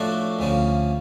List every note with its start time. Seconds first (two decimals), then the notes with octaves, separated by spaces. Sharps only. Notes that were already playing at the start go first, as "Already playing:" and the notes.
Already playing: A2 F3 A3 D4 F#4
0.39 D2 C#3 F3